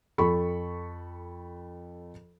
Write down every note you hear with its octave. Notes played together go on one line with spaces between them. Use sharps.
F2 A4 B5 C#6